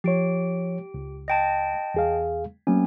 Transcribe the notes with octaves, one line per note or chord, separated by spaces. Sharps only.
F3 G4 C#5 D7
C#2
D#5 G5 A5
E2 G#4 F5
F#3 A3 A#3 C4 C#4 G#5